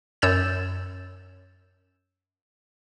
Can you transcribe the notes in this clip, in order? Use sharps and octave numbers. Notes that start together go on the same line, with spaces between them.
F#2 C#5 E6 G6 A6 E7